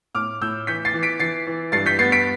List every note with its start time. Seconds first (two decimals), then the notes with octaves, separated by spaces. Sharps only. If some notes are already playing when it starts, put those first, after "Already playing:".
0.14 A2 D6 F6
0.41 A2 E6 G6
0.67 E3 G6 B6
0.85 A6 C7
0.94 E3
1.03 B6 D7
1.19 E3 A6 C7
1.47 E3
1.72 G2 A6 C7
1.86 G6 B6
1.99 B3 A6 C7
2.12 B6 D7